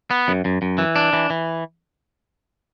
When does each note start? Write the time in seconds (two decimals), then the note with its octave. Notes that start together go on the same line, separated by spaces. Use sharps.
0.11 B3
0.28 F#2
0.45 F#2
0.62 F#2
0.78 E3
0.96 D4
1.13 E3
1.30 E3